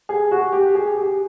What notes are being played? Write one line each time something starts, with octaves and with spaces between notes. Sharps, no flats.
G#4
F#4
G4
G#4
G4